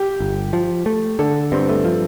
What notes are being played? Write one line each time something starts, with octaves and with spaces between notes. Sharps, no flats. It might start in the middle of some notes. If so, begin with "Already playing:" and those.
Already playing: G4
G1
F3
A3
D3 A4
G2 C4
A3
F3